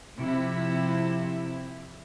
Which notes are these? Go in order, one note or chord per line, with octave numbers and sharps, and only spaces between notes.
C3 F3 E4